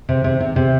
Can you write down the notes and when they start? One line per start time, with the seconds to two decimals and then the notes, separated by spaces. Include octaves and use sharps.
0.09 C3
0.24 C3
0.40 C3
0.56 C3